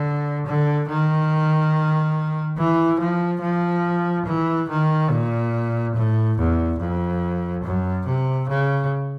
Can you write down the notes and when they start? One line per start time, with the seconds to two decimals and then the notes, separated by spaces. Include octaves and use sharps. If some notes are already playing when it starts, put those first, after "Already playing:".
Already playing: D3
0.47 D3
0.89 D#3
2.58 E3
3.00 F3
3.42 F3
4.26 E3
4.69 D#3
5.10 A#2
5.95 A2
6.38 E2
6.80 F2
7.64 F#2
8.06 C3
8.49 C#3